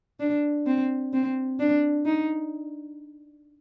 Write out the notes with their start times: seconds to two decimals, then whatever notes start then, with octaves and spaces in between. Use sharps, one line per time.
0.20 D4
0.67 C4
1.13 C4
1.59 D4
2.06 D#4